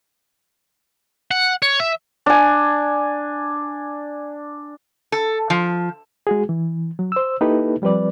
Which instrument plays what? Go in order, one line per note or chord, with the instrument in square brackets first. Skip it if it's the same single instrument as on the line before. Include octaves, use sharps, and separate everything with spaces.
[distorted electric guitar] F#5
C#5
E5
[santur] D4 G#5
[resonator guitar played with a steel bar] A4
F3
[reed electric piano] G#3 F#4 G#4
E3
F#3
C5 E6
A#3 D#4 E4 G4 A4 B4
F3 G3 C4 B4 D5